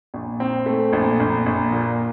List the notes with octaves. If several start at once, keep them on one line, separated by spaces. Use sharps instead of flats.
A#1
C4
A3
A#1
A#1
A#1
A#2